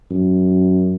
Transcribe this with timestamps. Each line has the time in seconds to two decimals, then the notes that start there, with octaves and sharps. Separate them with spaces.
0.11 F#2